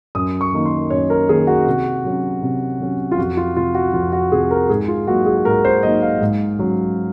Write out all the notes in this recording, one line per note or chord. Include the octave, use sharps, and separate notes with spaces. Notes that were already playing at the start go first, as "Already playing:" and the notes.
F#2 D#6
C#6
D#3 A#3 D#4
C6
F#2 C#5
A#4
D#3 A#3 D#4 G#4
F#4
C3
F#3 C#4
C3
F#3 C#4
F4
F2 F#4
F4
C3 F3 F4
F#4
F2 F4
F#4
C3 F3 G#4
A#4
G#2 G#4
F4
F#3 A#3 D#4 F#4
G#4
G#2 A#4
C5
F#3 A#3 D#4 D#5
F5
G#2
F#3 C#4